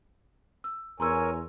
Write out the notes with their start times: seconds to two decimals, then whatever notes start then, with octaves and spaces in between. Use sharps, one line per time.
0.64 E6
1.00 E2 A#4 C#5 G#5 A#5 C6 E6